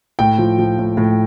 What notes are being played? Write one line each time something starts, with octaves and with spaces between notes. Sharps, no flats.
A2 G5
F3
F3
A2
A2